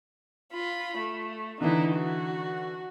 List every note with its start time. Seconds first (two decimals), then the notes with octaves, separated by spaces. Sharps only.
0.53 F4 B5
0.98 A3
1.61 D3 E3 D#4 E4
1.95 F#4